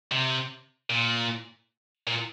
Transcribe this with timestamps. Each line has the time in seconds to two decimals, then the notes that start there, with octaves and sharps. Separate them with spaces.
0.12 C3
0.90 A#2
2.07 A#2